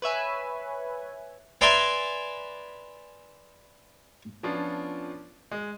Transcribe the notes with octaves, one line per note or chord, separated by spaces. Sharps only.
B4 C#5 E5 G#5
B4 D5 E5 G#5 A#5 C6
F3 B3 C#4 D4 F4
G#3